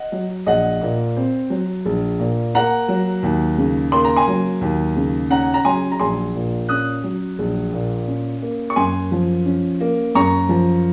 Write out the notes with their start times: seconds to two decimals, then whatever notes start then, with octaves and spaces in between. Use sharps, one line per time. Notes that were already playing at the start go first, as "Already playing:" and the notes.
Already playing: D#5 F#5
0.12 F#3
0.46 A#1 D#5 F#5
0.81 A#2
1.17 C4
1.50 F#3
1.86 A#1
2.19 A#2
2.54 A#3 F#5 A#5
2.88 F#3
3.23 D#2
3.58 C#3
3.92 A#3 C6
4.05 A#5
4.16 G#5 C6
4.28 F#3
4.61 D#2
4.96 C#3
5.30 C#4 F#5 A#5
5.54 A#5
5.65 F#3 G#5 C6
5.92 A#5
6.00 A#1 G#5 C6
6.35 A#2
6.69 C#4 D#6 F#6
7.04 F#3
7.39 A#1
7.72 A#2
8.08 C#4
8.42 A#3
8.70 C#6
8.76 F#2 G#5 C6
9.11 F3
9.46 C#4
9.81 A#3
10.15 F#2 A#5 C#6
10.49 F3